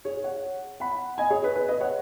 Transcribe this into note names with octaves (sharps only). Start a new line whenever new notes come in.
G#4 C#5
C#5 F#5
F#5 B5
D#5 G#5
G#4 C#5
B4
B4
B4 D#5
C#5 F#5